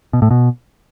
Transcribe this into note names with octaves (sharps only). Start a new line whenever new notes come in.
B2
A2
B2